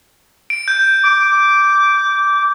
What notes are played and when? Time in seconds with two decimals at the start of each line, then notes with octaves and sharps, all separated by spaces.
0.50 D7
0.68 G6
1.03 D6